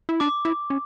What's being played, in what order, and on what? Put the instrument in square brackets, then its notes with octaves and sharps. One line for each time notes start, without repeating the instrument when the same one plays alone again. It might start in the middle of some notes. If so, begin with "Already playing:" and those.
[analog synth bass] E4
[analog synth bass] D4 [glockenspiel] D6
[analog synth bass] E4
C#4